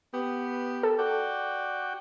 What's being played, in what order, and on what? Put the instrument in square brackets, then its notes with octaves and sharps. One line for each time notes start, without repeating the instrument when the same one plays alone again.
[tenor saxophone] B3 [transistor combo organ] G4
[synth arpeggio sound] A4
[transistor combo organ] F#4 G5 [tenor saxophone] D5